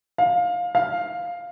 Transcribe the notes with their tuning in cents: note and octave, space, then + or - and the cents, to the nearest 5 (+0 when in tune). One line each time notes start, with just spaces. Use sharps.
F5 +20
F5 +5